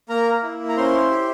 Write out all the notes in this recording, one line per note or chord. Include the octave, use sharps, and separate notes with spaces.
A#3 A#4 A#5
E4
A#5
C#4 C5 C6
G4